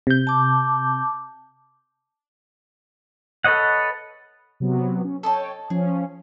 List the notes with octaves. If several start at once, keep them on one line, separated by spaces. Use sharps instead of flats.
C3 G6
A5 D6
A4 B4 C#5 D#5 F#5
C3 F#3 B3
C#4
A4 C#5 D#5 G5 A5
F3 C#4 G#4